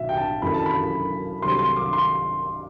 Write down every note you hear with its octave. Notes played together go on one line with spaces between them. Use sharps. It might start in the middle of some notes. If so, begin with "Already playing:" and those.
Already playing: B1 A2 F#3 E5
G5
A5
F#1 F#2 E3 A3 B5
A5
B5
C2 C3 F#3 A3 C4 C6
C6
D6
C6